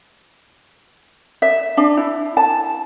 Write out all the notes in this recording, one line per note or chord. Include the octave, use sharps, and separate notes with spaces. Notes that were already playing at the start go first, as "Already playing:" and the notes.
E5
D4
E4
A5